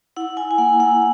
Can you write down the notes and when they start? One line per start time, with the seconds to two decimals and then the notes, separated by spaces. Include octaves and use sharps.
0.16 E4 F#5
0.37 E4 G#5
0.51 G#5
0.58 A#3 F#5
0.80 E4 F#5